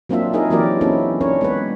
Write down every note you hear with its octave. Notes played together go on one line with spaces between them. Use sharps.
F#3 A#3 C4 D4 F4 E5
D#4 E4 G#4 A#4 D#5
E3 F#3 A#3 G4 A#4 D5
A#3 C4 C#4 E4 A4
C#4 D4 A#4 C#5
G#3 B3 B4